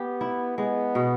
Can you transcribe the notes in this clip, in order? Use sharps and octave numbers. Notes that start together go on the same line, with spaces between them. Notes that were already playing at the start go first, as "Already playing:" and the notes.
Already playing: B3 G4
E4
G#3 B3
B2